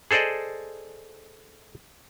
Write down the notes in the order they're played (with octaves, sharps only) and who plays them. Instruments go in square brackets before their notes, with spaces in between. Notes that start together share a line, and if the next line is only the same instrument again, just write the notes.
[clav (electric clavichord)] G#4 A4 C5 D5 D#5